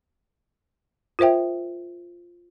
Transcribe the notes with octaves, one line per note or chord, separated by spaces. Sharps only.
F4 A#4 C5 E5 G5